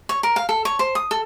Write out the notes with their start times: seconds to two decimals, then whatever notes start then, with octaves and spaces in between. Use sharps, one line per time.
0.09 C#5
0.23 A#4
0.36 F5
0.49 A4
0.65 C#5
0.79 C5
0.95 D#6
1.11 A4